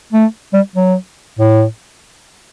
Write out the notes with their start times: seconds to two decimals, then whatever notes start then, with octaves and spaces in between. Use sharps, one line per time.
0.13 A3
0.54 G3
0.75 F#3
1.39 A2